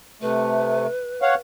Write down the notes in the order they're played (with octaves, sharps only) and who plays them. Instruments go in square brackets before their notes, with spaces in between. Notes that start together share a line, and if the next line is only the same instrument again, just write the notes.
[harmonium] C3 A3 [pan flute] B4
[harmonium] C#5 F5 F#5